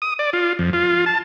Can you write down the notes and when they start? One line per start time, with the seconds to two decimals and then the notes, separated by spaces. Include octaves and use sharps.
0.02 D#6
0.19 D5
0.33 F4
0.59 F2
0.73 F4
1.06 A5